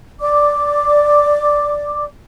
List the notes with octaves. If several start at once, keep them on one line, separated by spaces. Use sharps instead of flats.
D5 D6